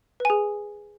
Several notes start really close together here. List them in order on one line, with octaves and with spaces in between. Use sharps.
B4 G#5 G#4